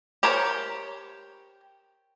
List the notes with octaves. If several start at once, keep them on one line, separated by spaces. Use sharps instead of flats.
G4 A#4 C5 C#5 A5